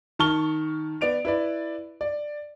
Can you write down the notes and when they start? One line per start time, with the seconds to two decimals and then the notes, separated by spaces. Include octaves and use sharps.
0.19 D#3 A5 C#6 F6 G7
1.01 B3 D5 D7 F7
1.25 E4 B4 D5
2.01 D5